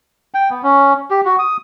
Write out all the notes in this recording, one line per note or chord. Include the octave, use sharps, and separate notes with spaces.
G5
B3
C#4
G4
F#4
D#6